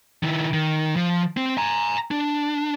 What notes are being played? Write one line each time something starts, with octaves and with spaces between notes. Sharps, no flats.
D#3 E4
D#3
F3
C4
G#5 A#5
D4